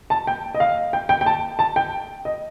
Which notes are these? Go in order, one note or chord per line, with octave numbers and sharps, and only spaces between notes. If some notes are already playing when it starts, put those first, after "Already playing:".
A5
G5
D#5
F5
G5
G5
G5
A5
A5
G5
D#5